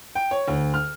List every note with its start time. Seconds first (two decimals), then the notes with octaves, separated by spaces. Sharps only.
0.15 G5
0.31 C#5
0.48 D2
0.74 F6